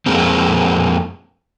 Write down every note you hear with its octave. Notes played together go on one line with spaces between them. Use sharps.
F2 G#3 A#3 C4